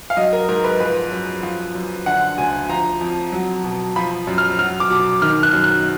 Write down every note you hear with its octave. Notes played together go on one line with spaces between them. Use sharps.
F5
F#3 D#5
A#4
G#2 A#4
B4
F3 B4
F#2
F3
F#2
D3 F#5
D2 G#5
F3 A#5
F2
F#3
B2
F3 B5
F#2
F6
F#3 F6
D6
B2
D#3 F6
F#6
F#2
F#6